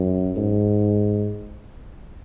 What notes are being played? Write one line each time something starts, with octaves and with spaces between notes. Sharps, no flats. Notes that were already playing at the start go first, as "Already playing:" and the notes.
Already playing: F#2
G#2